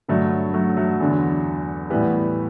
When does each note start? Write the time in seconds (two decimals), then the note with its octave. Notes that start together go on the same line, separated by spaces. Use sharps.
0.08 G2 D3 F#3 A3
0.54 F#3 A3
0.77 F#3 A3
1.00 E2 D3
1.90 A2 E3 G3 B3